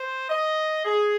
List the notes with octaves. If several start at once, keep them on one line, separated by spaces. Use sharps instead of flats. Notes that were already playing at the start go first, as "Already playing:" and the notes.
Already playing: C5
D#5
G#4